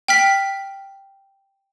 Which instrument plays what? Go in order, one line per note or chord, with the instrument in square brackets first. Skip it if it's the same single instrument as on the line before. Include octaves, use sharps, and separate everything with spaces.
[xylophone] G5 F6 B6